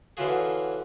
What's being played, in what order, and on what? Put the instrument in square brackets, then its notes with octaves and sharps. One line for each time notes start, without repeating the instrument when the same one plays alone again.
[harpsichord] D3 E3 C#4 F4 F#4 G#4